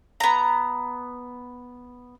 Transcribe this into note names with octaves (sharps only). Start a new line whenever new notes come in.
B3 A#5